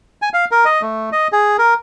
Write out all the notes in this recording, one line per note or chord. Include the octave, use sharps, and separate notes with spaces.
G#5
F5
A#4
D#5
A3
D#5
G#4
A#4